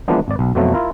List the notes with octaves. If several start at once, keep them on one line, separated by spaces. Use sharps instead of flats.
E3 F3 G#3 A#3 B3 D4
G#1 D5
B1
F2 B2 F3 F#3 A3
E4 F4 A#4